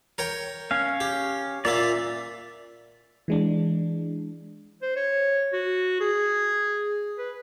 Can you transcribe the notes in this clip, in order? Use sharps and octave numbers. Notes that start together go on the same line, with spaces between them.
A#4 C#5 G5
C#4 F5
G4
A#2 A#3 F4 D5 E5
E3 G#3 D4
C5
C#5
F#4
G#4
B4